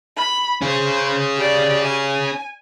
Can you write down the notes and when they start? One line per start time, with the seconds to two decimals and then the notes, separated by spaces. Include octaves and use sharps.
0.17 B5
0.62 C#4 G#4 C5
1.38 G4 D5
1.86 G#5